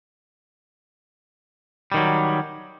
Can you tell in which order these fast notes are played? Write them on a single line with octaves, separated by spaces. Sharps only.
G3 D#3 F#3